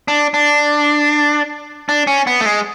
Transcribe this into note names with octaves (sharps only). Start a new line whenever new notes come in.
D4
D4
D4
C#4
B3
A3
G#3